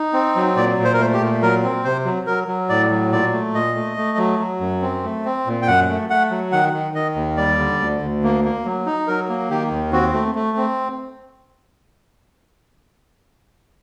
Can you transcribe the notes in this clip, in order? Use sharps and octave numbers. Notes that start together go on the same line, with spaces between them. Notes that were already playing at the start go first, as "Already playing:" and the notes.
Already playing: D#4
C4
F#3
A#2 D5
A#2
C5
A#4
A3 C5
G4
A#2
F#3 A#4
C4
C3 C5
F#3
F#3 A#4
F#3
A2 D5
F#3
A#2 D5
A3
A#2 D#5
A3
A3
F#3
F#3
F#2
C4
A3
C4
A#2
G5
F#2 F#5
A3
A3 F#5
F#3
D#3 F#5
D#3
D#3 D#5
D#2
G3 D5
D3
D2
D2
A#3
A#3
F#3
D#4
F#3 A#4
A#3
D#3 G4
D#2
C4 F#4
A3
A3
C4